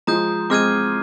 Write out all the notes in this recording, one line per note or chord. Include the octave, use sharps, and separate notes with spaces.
F3 G#3 A#5 D#6 G6
G#3 C4 D6 F6 G#6 D#7